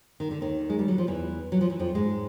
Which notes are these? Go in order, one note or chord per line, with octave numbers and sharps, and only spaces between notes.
D#3
D3
D#2 D#3
G#3
G3
F#3
F3
E2 E3
F#3
F3
E3
F2 F3
G#2 G#3